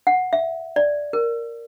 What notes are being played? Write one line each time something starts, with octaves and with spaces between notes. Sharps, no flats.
F#5
E5
D5
A#4